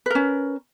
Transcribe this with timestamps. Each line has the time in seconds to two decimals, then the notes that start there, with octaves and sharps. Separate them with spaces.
0.06 B4
0.10 A#4
0.15 C#4